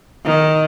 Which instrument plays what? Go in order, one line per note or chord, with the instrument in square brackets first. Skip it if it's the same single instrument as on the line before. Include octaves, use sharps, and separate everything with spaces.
[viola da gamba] D#3